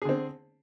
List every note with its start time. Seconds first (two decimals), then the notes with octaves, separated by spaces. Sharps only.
0.02 G#4
0.05 D3
0.09 C4